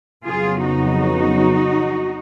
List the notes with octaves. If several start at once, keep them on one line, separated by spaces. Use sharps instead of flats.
F2 C#3 F#3 B3 F4 G#4
D#4 F#4